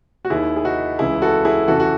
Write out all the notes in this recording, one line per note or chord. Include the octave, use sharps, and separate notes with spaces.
F#4
D#2 D#3 E4 G#4
G#4
D#4 F#4
C#2 C#3 E3 E4 G#4
F#4 A4
E4 G#4
E2 C#3 E3 F#4 A4
F#4